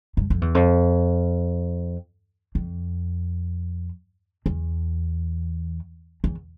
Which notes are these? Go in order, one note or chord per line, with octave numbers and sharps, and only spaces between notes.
G2
F2
E2
F2
F2
E2
E2